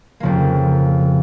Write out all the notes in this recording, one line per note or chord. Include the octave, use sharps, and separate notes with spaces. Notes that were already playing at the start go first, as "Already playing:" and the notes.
F2 C#3 F3 A#3